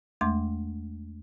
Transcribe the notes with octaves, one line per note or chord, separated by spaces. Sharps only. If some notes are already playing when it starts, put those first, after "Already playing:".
E2 G#3 A3 C6 D6